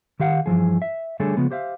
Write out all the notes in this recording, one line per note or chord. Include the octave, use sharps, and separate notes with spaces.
D#3 G4 F5 F#5
G2 E3 F3 G#4
E5
D3 G3 A3 G#4 A4 C#5
C#3 F3 G#3 B3
G4 C5 E5 F5